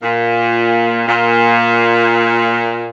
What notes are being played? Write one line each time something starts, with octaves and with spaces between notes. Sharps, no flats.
A#2
A#2